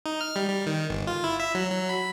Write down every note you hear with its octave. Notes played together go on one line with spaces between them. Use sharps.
D#4
F6
G3
G3
D#3
G1
F4
E4
E5
F#3
F#3
B5